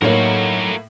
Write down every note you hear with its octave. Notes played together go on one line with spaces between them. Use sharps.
A2 F#3 A#3 D#4 F#4 A#4 C#5